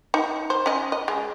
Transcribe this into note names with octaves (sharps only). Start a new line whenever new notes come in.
D#4
C5
C#4 D#5
D#5
G#3